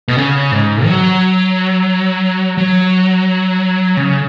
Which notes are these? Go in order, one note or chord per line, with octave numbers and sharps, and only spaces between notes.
B2
C#3
G#2
F#3
F#3
C#3